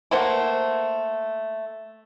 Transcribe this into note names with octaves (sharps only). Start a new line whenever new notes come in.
A3 A#3 C5 F#5